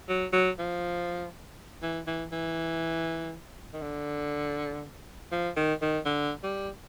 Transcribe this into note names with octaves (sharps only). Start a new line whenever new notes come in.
F#3
F#3
F3
E3
E3
E3
D#3
D3
F3
D#3
D#3
D3
G3